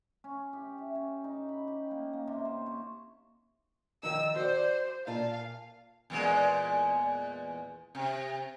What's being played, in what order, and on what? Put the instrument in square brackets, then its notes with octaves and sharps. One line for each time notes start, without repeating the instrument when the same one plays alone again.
[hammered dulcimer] C#4
G4
E5
C#4
D#4
B5
G4
A#3
A#3
C3
C5
C#6
[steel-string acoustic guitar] D#3 F3 D#4 [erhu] E6
[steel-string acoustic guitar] F#4 D5 [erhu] C5
[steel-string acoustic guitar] A#2 F4 A5 [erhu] F5
[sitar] E2 A#2 G#3
C3